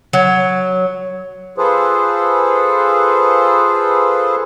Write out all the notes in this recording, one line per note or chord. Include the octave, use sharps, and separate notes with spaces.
F#3
F4 G#4 A4 B4 C5